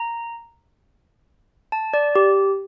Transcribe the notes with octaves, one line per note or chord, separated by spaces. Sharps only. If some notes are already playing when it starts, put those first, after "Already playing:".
Already playing: A#5
A5
D5
G4